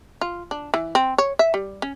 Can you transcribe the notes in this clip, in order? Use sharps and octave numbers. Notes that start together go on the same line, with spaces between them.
F4
D4
E3
C4
C#5
E5
G3
C#4